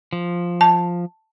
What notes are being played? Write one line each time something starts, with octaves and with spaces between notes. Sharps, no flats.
F3
A5